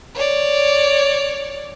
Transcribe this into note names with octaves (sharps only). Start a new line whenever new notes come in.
C#5 D5